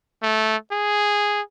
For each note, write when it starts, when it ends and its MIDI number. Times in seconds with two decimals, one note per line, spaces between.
0.23 0.56 57
0.71 1.41 68